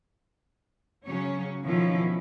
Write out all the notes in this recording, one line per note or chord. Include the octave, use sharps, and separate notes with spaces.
C#3 F#3 C#4 C#5
B2 D#3 F3 C#4 E4 F4